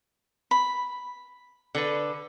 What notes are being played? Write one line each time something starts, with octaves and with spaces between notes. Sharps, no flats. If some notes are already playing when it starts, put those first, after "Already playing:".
B5
D3 A4 B4